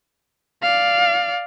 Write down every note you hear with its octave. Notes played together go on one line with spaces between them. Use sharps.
D5 F5